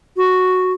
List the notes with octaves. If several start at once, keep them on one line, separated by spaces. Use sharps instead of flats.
F#4